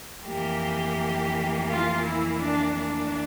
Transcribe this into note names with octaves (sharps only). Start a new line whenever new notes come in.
F2 E3 A#3 G4
F4
E4
D4
D4